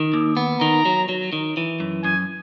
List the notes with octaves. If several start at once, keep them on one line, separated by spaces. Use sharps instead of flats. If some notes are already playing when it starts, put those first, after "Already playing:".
Already playing: D#3
D#2
B3
D#3 A#5
F#3
F#3
D#3
E3
F#2
F#2 G#5